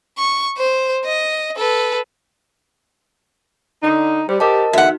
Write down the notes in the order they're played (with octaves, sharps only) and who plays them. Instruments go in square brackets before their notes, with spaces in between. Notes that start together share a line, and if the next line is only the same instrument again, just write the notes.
[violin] C#6
C5
D#5
A4 B4
[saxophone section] D3 D#4
[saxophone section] G3 [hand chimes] C5
[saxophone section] G4 [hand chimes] A#4 D#5 A5
[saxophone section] E2 D3 [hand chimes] D#4 F#4 [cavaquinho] E5 F#5